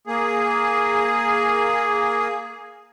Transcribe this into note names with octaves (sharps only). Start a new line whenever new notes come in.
A#3 G#4